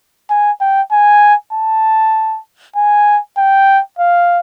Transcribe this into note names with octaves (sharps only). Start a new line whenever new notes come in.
G#5
G5
G#5
A5
G#5
G5
F5